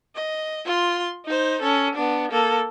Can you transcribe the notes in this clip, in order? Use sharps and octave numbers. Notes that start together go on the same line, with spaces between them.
D#5
F4 C6
D#4 C5
C#4 A4
B3 D4
A#3 A4